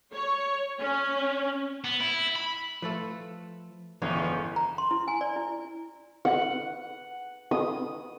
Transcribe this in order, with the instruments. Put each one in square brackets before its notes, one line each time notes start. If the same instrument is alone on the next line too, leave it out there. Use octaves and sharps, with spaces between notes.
[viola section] C#5
C#4
[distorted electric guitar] B3
E4
B5
[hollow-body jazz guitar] F3 [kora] A3 A4 B4
[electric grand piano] G1 [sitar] E2 A2 C#4 [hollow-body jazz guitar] E3 F3 G#3 [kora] G#4
[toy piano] A#5
C6
E4
G#5
D5
E4
[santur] F#5
D#6